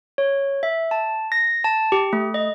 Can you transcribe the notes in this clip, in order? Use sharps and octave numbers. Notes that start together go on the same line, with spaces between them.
C#5
E5
A5
A#6
A5
G4
A3
D#5